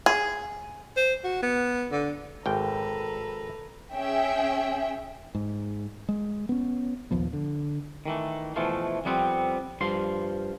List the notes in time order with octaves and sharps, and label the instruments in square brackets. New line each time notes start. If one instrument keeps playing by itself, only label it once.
[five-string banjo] G#4
[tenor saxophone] C5
F#4
B3
D3
[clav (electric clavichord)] G#1 G5 [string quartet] A4 B4 A#5
[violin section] C#4 G#4 E5 G5
[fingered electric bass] G#2
G#3
B3 C#4
A#1 D#2 F3 B3
D3
[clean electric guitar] D#3 E3 A3
B2 E3 F3 A3 F4
F2 G3 B3 C4
G2 F3 C6